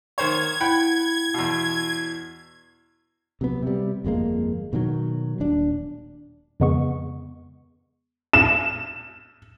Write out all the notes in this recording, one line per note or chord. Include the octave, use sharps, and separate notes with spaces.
D#3 C5 C#5 G#6
E4 F#5 G5 B5
E2 B2
C3 F#3 B3
C3 G3
G1 F2 G#3 A#3
B2 D#3 F3 F#3
D#1 D4
F2 C#3 G#3 B3 C#6
E7